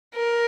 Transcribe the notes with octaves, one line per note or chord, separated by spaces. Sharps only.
A#4